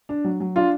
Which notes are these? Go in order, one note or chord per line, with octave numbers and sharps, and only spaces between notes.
D4
F#3
F#3
D4 F4